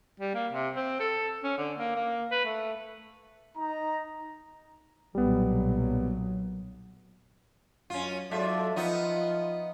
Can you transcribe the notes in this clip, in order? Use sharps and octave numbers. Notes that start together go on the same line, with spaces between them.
G3
A#3
C3
C4
A4
C#4
D3
A#3
A#3
B4
A3
D#4 A#5
B1 A#2 F#3 G3 B3
F#2 C#4 F4
G#2 F#3 F4 A4 D5 E5
F3 B3 D#4 F4